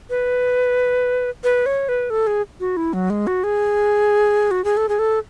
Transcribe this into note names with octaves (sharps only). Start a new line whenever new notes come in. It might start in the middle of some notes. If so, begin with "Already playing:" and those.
B4
B4
C#5
B4
A4
G#4
F#4
E4
F#3
G#3
F#4
G#4
F#4
G#4
A4
G#4
A4